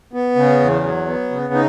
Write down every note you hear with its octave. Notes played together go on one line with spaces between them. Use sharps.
B3
C#3
E2
F#3
B3
C#3
D#4